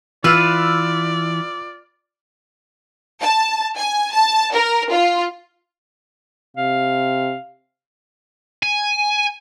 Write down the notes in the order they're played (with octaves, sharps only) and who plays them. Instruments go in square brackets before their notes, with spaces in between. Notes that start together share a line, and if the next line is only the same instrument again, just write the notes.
[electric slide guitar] E3 [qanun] F4 B4 [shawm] D5 [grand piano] E6 F6
[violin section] A5
G#5
A5
A#4
F4
[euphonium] C3 [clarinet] F5
[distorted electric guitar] G#5